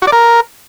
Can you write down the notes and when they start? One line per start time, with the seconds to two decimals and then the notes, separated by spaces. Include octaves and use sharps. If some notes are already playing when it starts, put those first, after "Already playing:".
0.02 F#4
0.07 D5
0.12 A#4